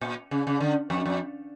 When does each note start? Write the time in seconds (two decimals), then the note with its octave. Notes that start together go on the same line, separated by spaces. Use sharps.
0.01 A#2
0.31 C#3
0.47 C#3
0.60 D3
0.90 F2
1.06 F2